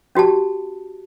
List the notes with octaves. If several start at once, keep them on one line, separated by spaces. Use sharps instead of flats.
C#4 F#4 G4 A5